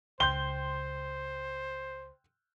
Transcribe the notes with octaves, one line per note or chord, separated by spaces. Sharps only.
C#2 C5 G5 C6 G6 G7